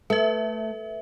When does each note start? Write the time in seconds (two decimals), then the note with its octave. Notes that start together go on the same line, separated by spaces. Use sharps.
0.10 A3 B4 E5